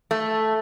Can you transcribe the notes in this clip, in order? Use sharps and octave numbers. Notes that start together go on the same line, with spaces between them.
A3